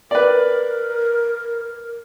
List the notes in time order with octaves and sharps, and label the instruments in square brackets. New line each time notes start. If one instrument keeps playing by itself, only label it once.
[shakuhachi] A#4 [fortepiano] B4 D5